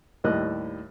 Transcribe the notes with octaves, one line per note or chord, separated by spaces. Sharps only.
D#2 A2 G3 D#5 F#6